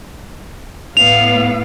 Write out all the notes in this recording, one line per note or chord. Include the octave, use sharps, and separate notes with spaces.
A2 B3 F5 F7